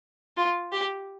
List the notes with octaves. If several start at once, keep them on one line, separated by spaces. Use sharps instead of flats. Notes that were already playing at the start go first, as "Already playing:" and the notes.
F4
G4